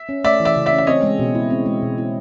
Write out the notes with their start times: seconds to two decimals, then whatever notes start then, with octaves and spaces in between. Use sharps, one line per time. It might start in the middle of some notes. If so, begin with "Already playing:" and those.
Already playing: E5
0.09 C#4
0.24 A3 D5 E5
0.40 E3
0.45 D5 E5
0.56 C#3
0.66 D5 E5
0.72 C#4
0.78 E5
0.87 C4 C#5 D#5
1.03 G#3
1.19 B2
1.35 E4
1.50 C4
1.66 G#3
1.82 B2
1.98 E4